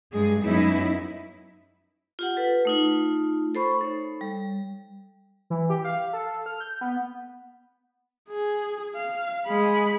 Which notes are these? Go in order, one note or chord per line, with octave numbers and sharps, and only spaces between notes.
G2 G#3 G#4
F#2 G#3 B3 D#4 E4
F4 G4 F#5
A4 B4
A3 D#4 F4
A4 C5 B5 C#6
D#4 A4 C#5
G3
E3
G4
F5
A4
F6
G6
B3
G#4
F5
G#3 B5